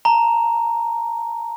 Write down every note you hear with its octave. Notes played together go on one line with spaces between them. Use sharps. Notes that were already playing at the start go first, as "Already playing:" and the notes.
A5 A#5